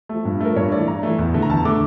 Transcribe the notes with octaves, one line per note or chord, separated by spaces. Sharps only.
F3 A3
G2
F3 A3 A#4
G2 C#5
E3 A3 D5
G2 A#5
E3 A3
E2
D3 A3
A#5
E2 A5
D3 A3 D6